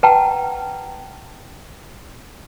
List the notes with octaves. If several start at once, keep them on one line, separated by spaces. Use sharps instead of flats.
B4 F#5 G5 A5 A#5